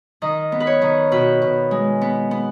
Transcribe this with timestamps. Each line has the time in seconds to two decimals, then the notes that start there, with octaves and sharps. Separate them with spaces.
0.22 D#3 D#5
0.52 B3
0.60 B4
0.67 C#5
0.82 D#3
1.12 B2 B4
1.42 B2
1.71 G#3
2.01 B3
2.31 B3